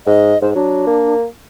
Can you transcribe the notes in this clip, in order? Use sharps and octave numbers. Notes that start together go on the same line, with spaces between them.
G#2 D#5
G#2 C5
F#3 D4
A#3